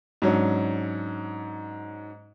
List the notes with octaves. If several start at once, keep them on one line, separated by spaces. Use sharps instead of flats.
G#2 F#3 C#4 D4